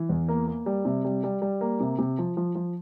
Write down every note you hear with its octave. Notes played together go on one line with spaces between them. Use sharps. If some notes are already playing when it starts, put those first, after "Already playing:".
Already playing: E3
E2
A#3
A#3
G3
C3
G3
G3
G3
A#3
C3
C3
F3
F3
F3